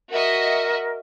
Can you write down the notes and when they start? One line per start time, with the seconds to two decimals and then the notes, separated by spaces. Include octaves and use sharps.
0.10 F#4 A#4 D#5 E5